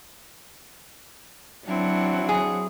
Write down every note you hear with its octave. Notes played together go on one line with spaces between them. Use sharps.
F#3 C4 D4 E4 F#5
G#4